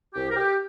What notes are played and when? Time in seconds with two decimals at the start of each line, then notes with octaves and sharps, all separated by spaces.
0.14 C2 G4
0.31 A#4
0.35 G4